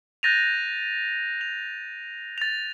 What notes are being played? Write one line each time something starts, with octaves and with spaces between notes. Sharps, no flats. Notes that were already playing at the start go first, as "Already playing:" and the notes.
F#6 G6 A6 A#6 D#7 F7
F7
A6 F7